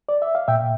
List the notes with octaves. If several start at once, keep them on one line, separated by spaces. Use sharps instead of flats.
D5
E5
F5
A#2 E5 G5